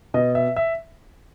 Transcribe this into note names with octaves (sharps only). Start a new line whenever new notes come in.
B2 D#5
E5
E5